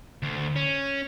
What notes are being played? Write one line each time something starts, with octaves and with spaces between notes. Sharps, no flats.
D2
C#4